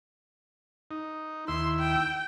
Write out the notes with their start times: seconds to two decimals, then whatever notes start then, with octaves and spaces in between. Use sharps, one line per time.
0.91 D#4
1.48 D#2 E4 C6 E6
1.79 G5